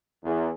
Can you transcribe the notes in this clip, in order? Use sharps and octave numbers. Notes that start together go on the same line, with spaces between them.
E2